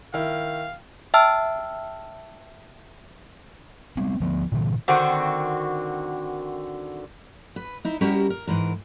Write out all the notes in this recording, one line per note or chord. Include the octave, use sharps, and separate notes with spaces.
D#3 E4 F5
E5 G5 A5 E6 F6
G3 B3 C4
D2 F3 B3
A#2 D3 E3
D3 D#3 C4 F#4
B4
D#4 E4
G3 C#4 E4 F#4 G4 A#4
A#4
G#2 E3 A#4